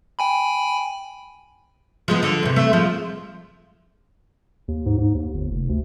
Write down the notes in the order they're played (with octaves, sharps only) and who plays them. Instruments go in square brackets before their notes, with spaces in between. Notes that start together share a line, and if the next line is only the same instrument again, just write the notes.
[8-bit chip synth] G5 G#5 B5
[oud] F3 G#3 B3
D3
E2 C3
A3
F3 G#3
[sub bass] D#2
G#2
G#2
D#2
G1
F1
D2